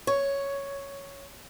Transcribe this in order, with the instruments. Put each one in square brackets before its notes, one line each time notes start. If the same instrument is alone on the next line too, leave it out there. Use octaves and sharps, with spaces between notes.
[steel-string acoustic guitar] C#5